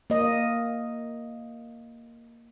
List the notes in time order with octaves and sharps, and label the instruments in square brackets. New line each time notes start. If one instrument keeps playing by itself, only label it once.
[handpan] A#3 D#5